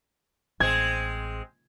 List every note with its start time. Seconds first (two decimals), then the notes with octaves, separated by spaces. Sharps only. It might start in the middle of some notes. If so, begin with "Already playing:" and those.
0.60 A1 G#3 C4 G#6